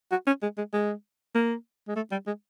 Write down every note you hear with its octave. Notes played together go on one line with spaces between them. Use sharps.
F#4
C#4
G#3
G#3
G#3
A#3
G#3
A3
G3
G#3